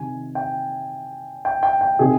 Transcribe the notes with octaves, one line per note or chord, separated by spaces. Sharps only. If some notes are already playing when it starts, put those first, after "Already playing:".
Already playing: C3 D#3 G#5
G5
G5
G5
G5
C3 D#3 G#4